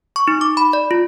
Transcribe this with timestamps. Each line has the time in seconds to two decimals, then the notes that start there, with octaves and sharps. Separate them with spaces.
0.16 C#6
0.28 D#4
0.41 D6
0.57 B5
0.73 D5
0.91 F4